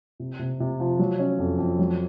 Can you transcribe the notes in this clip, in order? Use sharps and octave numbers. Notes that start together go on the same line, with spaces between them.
C3
C3
C3
F3
F#3
C#4
F2
F2
F#3